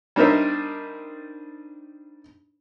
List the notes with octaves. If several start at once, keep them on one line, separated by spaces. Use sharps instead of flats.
G3 D4 D#4 A#4 C5 E5